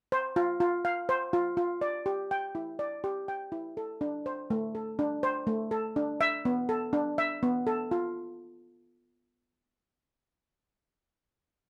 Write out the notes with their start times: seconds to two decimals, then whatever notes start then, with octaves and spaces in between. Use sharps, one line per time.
0.12 C5
0.36 F4
0.60 F4
0.85 F5
1.09 C5
1.33 F4
1.57 F4
1.81 D5
2.06 G4
2.31 G5
2.55 E4
2.79 D5
3.04 G4
3.28 G5
3.52 E4
3.77 A4
4.01 D4
4.26 C5
4.50 A3
4.75 A4
4.99 D4
5.23 C5
5.47 A3
5.71 A4
5.96 D4
6.21 E5
6.45 B3
6.69 A4
6.93 D4
7.18 E5
7.43 B3
7.67 A4
7.91 F4